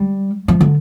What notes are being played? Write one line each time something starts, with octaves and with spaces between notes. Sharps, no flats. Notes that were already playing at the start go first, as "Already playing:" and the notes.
Already playing: G3
F3
D3